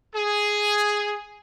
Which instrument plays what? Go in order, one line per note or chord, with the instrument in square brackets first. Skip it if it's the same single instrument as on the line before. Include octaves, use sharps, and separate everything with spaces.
[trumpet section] G#4